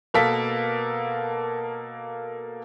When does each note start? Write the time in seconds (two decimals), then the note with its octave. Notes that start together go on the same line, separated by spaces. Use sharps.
0.14 B2 A#3 A4 B6